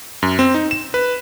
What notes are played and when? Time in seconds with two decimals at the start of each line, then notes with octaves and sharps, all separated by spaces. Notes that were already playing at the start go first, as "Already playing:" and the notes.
0.22 F#2
0.39 C4
0.54 D#4
0.71 E7
0.94 B4